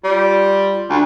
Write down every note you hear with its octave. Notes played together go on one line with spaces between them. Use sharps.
G3 F4
D2